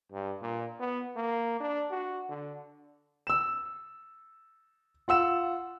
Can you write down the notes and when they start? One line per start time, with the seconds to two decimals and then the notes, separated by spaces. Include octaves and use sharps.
0.12 G2
0.41 A#2
0.80 B3
1.16 A#3
1.60 D4
1.91 F#4
2.29 D3
3.27 E6 E7
5.08 F4 F#5 E6 E7